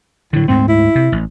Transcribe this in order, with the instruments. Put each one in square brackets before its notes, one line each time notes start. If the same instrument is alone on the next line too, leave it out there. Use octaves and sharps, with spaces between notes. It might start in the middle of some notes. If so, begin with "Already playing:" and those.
[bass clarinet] A2 [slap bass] D3 F#3
[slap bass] D2 G#2 A3 [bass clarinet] C4
[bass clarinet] E4
[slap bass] C3
A1